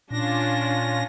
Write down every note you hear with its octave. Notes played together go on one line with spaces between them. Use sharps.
A#2 C#4 D4 F4 A#6